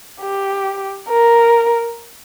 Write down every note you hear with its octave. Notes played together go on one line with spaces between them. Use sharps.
G4
A#4